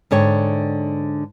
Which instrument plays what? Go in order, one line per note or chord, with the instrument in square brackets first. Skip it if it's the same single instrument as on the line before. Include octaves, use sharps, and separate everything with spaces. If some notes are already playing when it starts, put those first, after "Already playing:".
[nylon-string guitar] G#2 D3 C#5 G5